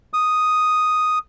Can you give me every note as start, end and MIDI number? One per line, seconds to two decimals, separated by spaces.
0.13 1.19 87